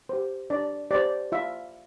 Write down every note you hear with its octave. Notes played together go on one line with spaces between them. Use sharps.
G4 C5
D4 D5
G4 C5 D5
F4 E5